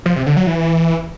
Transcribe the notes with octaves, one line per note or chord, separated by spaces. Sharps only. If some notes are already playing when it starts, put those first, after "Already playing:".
F3
C3
D3
F#3
E3